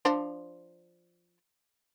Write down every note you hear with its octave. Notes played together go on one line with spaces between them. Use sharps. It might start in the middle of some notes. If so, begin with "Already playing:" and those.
F3 D4 C5